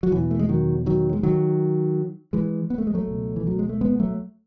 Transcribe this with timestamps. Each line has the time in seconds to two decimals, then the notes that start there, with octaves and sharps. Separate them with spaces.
0.03 F#3
0.12 E2 B2 E3
0.31 A3
0.39 G#3
0.49 D#3 F#3
0.86 D#3 F#3
1.13 G#3
1.23 D#3 F#3
2.33 E3 G#3
2.70 B3
2.78 A3
2.87 G#3
2.94 F#3 A3
3.07 C#2 B2
3.36 E3
3.47 F#3
3.59 G#3
3.69 A3
3.81 G#3 B3
4.00 F#3 A3